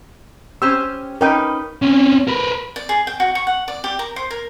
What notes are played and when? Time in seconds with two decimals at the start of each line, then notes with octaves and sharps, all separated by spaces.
0.62 C#4 G4 C5 E6
1.21 C#4 D#4 A#4 B4 G5
1.82 C4 C#4
2.28 A#4 B4
2.76 D5
2.89 G#4
3.07 G5
3.20 F#4
3.35 C#6
3.47 F#5
3.68 D5
3.84 G4
3.99 A#4
4.16 C5
4.30 A#4